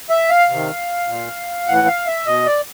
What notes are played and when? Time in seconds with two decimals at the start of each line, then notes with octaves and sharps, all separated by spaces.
0.10 E5
0.29 F5
0.49 C3 D#3
1.08 A#2
1.67 A2 E3 F#5
1.87 F5
2.07 E5
2.26 B2 D#5
2.46 D5